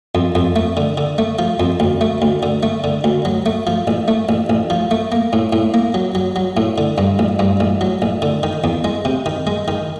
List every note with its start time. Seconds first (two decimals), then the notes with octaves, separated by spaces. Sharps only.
0.15 F2
0.35 F2
0.56 A3
0.77 D3
0.98 D3
1.18 A3
1.39 F3
1.60 F2
1.80 D2
2.01 A3
2.22 D2
2.43 D3
2.63 A3
2.84 D3
3.04 D2
3.25 F#3
3.46 A3
3.67 F3
3.88 A1
4.08 A3
4.29 A1
4.50 A1
4.70 F3
4.91 A3
5.12 A#3
5.33 A2
5.53 A2
5.74 A#3
5.94 F#3
6.15 F#3
6.36 F#3
6.57 A2
6.78 D3
6.98 G2
7.19 A1
7.39 G2
7.60 A1
7.81 F#3
8.02 A1
8.22 D3
8.43 D#3
8.64 E2
8.84 G#3
9.05 C3
9.26 D#3
9.47 G#3
9.68 D#3